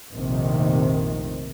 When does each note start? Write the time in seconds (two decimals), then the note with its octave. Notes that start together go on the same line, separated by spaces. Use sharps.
0.12 F1 A#1 C3 D#3